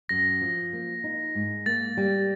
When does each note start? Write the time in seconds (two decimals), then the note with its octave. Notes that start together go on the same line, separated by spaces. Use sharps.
0.09 F#2 A#6
0.41 F3
0.73 A#3
1.04 D#4
1.35 G#2
1.66 A#3 A6
1.97 G3